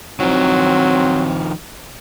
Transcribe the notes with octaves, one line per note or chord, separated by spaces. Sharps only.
D#3 F3 F#3 C4